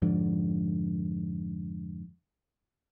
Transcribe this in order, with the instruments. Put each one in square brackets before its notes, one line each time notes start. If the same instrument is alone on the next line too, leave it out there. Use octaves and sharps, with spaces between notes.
[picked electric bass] F2 G#2 D3